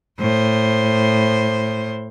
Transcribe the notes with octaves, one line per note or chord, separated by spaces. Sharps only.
A2 C5